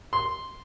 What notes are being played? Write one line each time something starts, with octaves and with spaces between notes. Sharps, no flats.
C6